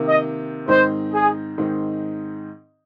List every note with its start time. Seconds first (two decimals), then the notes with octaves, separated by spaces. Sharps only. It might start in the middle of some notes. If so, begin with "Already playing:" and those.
Already playing: C3 D#3 A#3
0.08 D#5
0.68 G#2 D#3 C4 D#4 C5
1.13 G#4
1.58 G#2 D#3 C4 D#4